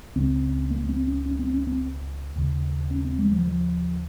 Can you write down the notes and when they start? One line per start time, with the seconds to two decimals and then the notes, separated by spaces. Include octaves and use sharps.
0.16 C#2 C#3 C4
0.71 A#3
0.84 A#3
0.89 C4
1.07 C#4
1.26 C#4
1.39 C4
1.53 C#4
1.67 C4
2.36 D#2 C#3
2.91 C#4
3.05 C4
3.19 G#3
3.32 F3
3.46 F3